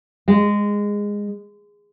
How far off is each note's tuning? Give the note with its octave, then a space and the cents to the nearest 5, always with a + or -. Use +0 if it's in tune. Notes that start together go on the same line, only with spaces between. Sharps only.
G#3 -15